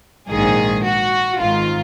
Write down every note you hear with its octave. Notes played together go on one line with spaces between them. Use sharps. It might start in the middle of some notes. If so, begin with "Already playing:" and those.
A#1 G#2 D#3 G#4
F#4
G#1 G#2 D#3 F4